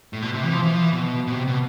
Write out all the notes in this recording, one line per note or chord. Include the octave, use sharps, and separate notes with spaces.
A2
B2
C3
E3
F3
E3
F3
E3
B2
B2
C3
B2